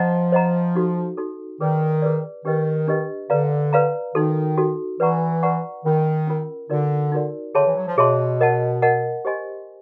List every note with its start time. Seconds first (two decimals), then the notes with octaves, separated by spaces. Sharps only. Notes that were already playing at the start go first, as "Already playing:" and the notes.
Already playing: F3 C5 D#5 F#5 A#5
0.32 C5 D#5 F#5 A#5
0.75 D#4 F#4 A4
1.17 D#4 F#4 A4
1.60 D#3 G#4 B4 D5
2.02 G#4 B4 D5
2.45 D#3 D4 G4 B4 D#5
2.88 D4 G4 B4 D#5
3.30 D3 B4 D5 F5 A#5
3.73 B4 D5 F5 A#5
4.15 D#3 D#4 F#4 A4
4.58 D#4 F#4 A4
5.00 E3 B4 D5 F#5 A#5 C#6
5.43 B4 D5 F#5 A#5 C#6
5.84 D#3 C#4 F4 A#4
6.27 C#4 F4 A#4
6.70 D3 D#4 F#4 A#4 D5
7.12 D#4 F#4 A#4 D5
7.55 D3 G#4 C#5 E5 A5 C6
7.66 E3
7.76 F#3
7.87 F3
7.98 B2 G#4 C#5 E5 A5 C6
8.41 A#4 D#5 F#5 A5
8.82 A#4 D#5 F#5 A5
9.25 G4 C5 D#5 G#5 C6